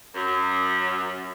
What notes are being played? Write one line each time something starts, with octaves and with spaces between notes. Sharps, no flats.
F#2